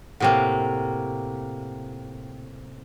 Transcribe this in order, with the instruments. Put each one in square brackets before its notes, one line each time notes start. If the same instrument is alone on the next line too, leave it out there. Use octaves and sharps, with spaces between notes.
[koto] A2 C3 A#3 [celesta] F#5 G5